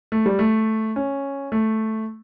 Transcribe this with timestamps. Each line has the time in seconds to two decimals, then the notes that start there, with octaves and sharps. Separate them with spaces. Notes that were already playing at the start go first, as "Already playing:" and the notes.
0.12 A3
0.26 G3
0.39 A3
0.96 C#4
1.52 A3